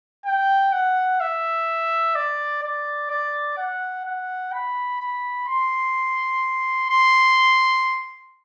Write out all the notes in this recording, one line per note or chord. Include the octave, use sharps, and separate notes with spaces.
G5
F#5
E5
D5
D5
D5
F#5
F#5
B5
B5
C6
C6